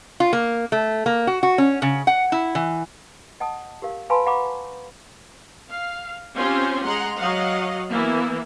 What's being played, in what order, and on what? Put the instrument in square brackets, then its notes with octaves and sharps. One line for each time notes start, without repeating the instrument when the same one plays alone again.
[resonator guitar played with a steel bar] F4
A#3
A3
A#3
F#4
F#4
C#4
C#3
F#5
E4
E3
[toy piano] D#5 F#5 A5 D#6
G4 A#4 F5
B4 F5 G#5 A5 B5 C6
F5 F#5 A#5 B5 C#6 D6
[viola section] F5
C4 C#4 F4 G4 C5 G#5
G#3 F#5 A#5 C6
F#3 D#5 F5 F#5
E3 A#3 B3 E4